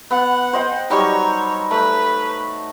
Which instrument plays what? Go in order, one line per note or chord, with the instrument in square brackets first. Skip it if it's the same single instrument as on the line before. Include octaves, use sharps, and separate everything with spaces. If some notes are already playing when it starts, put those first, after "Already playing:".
[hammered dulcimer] B3 [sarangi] F#5
[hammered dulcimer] C5 D#5 G5
[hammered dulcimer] F#3 G3 D#4 [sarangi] C#5
[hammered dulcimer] A3 [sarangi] B4